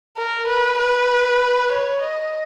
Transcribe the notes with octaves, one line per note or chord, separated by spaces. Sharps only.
A#4
B4
B4
C#5
D#5